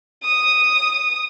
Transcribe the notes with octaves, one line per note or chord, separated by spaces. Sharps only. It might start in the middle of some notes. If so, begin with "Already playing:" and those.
D#6